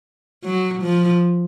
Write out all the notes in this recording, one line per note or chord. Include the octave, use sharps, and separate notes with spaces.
F#3
F3